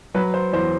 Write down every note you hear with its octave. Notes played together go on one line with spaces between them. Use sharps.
F#3 B4
C5
E2 C5